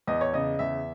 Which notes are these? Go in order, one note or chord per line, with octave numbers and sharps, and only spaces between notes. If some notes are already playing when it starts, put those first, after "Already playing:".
E2 D#5
C#5
C#3 D#5
E2 E5